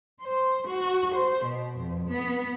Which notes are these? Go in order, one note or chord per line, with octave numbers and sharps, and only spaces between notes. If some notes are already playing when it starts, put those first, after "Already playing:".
C5
F#4
C5
B2
F2
B3